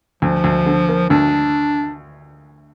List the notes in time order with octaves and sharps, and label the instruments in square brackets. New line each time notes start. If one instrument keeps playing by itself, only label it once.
[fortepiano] D2 [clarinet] F3
[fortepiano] D2
D3
A#3
[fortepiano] D2 [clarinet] D4